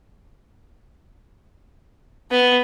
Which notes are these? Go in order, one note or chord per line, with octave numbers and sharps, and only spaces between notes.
B3